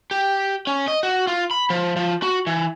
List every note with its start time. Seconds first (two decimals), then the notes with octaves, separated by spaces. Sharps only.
0.11 G4
0.67 C#4
0.88 D#5
1.03 F#4
1.27 F4
1.51 B5
1.70 F3
1.96 F3
2.23 F#4
2.47 E3